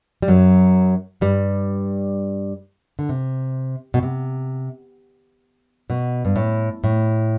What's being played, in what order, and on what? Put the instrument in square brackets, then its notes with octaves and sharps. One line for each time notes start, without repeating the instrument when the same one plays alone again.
[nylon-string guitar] G3
F#2 F#3
G2 G3
D3
C3
B2
C3
B2
G2
A2
A2